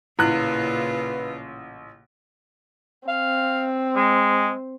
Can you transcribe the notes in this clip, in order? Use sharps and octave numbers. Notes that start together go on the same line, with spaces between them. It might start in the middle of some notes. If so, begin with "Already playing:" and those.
A1 A#2 C#3 E4 F4 B4 F#6
C4 F5
G#3